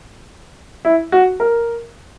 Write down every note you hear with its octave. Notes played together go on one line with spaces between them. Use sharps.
E4
F#4
A#4